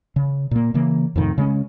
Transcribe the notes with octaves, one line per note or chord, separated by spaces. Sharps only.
C#3
A#2 A#3
C#3 E3 A#3
F2 A2 C3 D#3
C#3 G#3 C#4